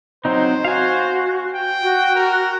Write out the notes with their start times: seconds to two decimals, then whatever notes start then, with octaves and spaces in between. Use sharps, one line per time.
0.25 F#3 C4 D#4 C5
0.65 F#4 F5 G#5
1.54 G5
1.83 F#4
2.15 A#4